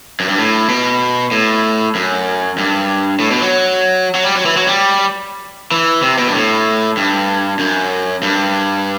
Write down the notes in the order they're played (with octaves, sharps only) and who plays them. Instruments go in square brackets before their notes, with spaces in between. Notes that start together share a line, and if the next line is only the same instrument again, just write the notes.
[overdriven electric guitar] F#2
G2
A2
B2
A2
F#2
G2
A2
B2
F#3
F#3
G3
F#3
E3
F#3
G3
E3
C3
B2
G2
A2
G2
F#2
G2